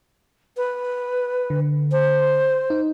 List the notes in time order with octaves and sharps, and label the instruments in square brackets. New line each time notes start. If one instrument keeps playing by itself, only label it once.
[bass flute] B4
[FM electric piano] D3
[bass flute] C5
[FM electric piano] D#4